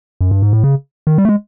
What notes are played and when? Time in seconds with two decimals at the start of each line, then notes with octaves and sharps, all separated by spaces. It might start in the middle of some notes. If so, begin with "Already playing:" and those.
0.21 F#2
0.31 G2
0.42 G#2
0.53 A2
0.64 C#3
1.07 D#3
1.18 G3
1.25 A3
1.29 G#3